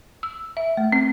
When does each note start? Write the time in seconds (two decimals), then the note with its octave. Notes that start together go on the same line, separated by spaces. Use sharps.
0.23 E6
0.57 E5
0.77 A3
0.92 C4